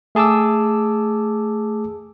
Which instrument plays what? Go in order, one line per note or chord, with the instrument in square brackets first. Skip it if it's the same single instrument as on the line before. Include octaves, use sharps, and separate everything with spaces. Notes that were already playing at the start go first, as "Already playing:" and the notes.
[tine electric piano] A3 G#4 A5 D6 E6